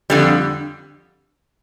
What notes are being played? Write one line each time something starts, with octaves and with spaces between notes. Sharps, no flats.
F2 D3 G3